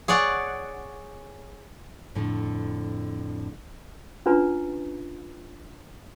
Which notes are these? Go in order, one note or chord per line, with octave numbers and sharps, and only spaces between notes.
G#4 C#5 D5 F#5
F2 A2 D3
C#4 D4 F4 B4 A#5